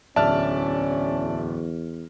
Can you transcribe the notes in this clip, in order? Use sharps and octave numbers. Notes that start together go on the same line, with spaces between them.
D1 E2 C#4 D5 E5 A5 F6